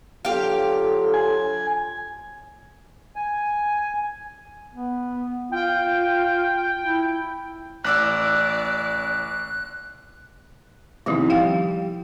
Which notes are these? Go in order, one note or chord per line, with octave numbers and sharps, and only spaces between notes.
D3 F#3 F4 G4 F5
G#5
G#5
B3
F4 G5
E4
A1 D5 D6 E6 F#6
E2 C3 D#3 F3 D#4
G3 G4 F5 G5